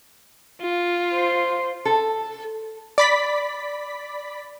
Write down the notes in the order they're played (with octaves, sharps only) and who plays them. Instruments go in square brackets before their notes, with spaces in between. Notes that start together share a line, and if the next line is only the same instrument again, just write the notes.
[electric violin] F4
[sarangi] C5
[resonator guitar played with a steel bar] A4
[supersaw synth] D5 B5 B6